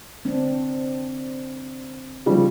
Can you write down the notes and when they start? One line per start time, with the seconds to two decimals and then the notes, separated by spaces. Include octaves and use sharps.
0.25 D3 C4 D4
2.26 C#3 F3 G3